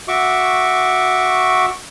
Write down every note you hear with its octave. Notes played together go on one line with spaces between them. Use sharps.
F#4 E5 C#6 D6